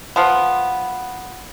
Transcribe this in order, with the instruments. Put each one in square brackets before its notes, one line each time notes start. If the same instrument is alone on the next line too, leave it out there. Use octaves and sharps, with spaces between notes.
[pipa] F3 B3